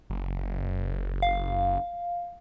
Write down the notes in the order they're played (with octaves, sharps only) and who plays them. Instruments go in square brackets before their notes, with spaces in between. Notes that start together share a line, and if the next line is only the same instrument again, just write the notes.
[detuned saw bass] F#1
[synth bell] F5